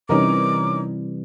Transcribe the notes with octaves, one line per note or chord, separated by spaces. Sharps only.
C3 E3 G3 C#4 D#4 A#4 D6